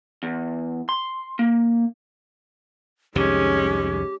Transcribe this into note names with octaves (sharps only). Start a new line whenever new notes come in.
E2
C6
A#3
C2 F2 D#3 G#3 C#4 G4